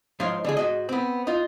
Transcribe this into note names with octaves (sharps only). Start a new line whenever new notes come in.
G#2 F3 D#4 C5 C#5 F5
D3 G#3 G#4
G#2 F#4 D#5
B3 C4
D#4 F4